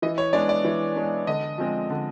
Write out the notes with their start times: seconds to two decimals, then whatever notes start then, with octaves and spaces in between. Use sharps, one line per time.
0.02 E3 D#5
0.18 C#5
0.33 G#3 B3 D4 D5
0.49 D5
0.64 E3
0.96 G#3 B3 D4
1.27 D3 D#5
1.58 F3 G#3 C4
1.90 D3